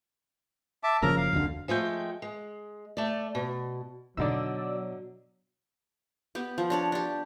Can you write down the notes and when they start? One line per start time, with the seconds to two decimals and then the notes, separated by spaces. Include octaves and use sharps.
0.83 E5 A5 D6
1.02 F#1 C#3 F3 A#4 A#5
1.17 F5
1.33 F1 D2 D3
1.68 F3 G#3 A3 G5
2.22 G#3
2.97 A3 D5
3.35 B2
4.17 B2 D3 F#3 D#4 D5 E6
6.35 B3 G4
6.58 F3
6.70 D4 C#5 D5
6.92 D4 G4